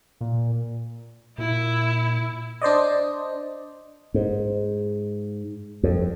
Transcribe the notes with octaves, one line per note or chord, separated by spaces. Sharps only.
A#2
A#2 E4
D4 C5 D5 D#5
G#2
F2